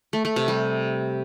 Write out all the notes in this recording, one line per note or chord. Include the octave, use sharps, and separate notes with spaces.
A3
A3
C3
G3